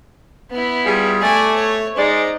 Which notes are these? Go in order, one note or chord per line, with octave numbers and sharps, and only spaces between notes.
B3 E4
G3 F4 G#4
A3 D5 G#5
C#5
G#3 D#4 C5 D5